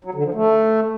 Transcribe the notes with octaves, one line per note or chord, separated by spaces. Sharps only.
F#3
D3
F3
A3